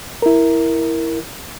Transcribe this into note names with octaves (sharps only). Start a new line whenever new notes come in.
E4 A#4